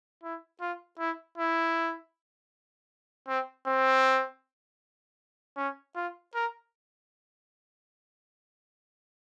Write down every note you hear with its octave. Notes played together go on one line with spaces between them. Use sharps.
E4
F4
E4
E4
C4
C4
C#4
F4
A#4